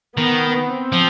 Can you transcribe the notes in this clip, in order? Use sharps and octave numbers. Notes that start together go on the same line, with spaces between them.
D#3 B3
C4
F3